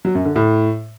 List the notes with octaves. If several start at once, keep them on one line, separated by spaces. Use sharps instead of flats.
F#3
F#2
D3
A2